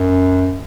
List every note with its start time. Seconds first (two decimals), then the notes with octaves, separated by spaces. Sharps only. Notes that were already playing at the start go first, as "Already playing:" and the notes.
Already playing: F#2